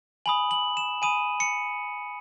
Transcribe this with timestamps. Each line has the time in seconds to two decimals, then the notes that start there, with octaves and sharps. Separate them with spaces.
0.26 G#5 B5 D#6 F#7
0.51 F#7
0.77 E7
1.02 G#5 B5 D#6 D#7
1.40 C#7